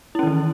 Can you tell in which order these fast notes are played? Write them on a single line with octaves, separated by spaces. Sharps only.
E4 C#4 D#3 E3